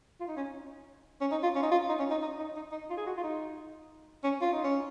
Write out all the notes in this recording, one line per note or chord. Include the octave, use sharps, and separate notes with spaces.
F4
D#4
C#4
C#4
D#4
F4
C#4
D#4
F4
D#4
C#4
D#4
D#4
D#4
D#4
D#4
F4
G#4
F#4
F4
D#4
C#4
F4
D#4
C#4